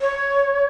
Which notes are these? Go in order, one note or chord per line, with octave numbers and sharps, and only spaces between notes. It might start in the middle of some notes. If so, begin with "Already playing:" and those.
C#5